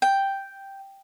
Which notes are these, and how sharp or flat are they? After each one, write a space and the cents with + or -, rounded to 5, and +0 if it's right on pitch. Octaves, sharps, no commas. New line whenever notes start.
G5 +0